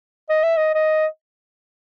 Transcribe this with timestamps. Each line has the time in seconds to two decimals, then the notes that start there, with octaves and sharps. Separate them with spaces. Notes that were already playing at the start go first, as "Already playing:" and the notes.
0.30 D#5
0.43 E5
0.57 D#5
0.75 D#5